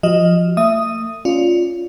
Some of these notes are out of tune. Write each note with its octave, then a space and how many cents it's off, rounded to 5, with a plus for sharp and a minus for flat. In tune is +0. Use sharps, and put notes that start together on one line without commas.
F3 +0 F#4 +30 D#5 +0
A3 +45 E5 +15 D#6 +0
C#4 +10 F4 +0 D5 +0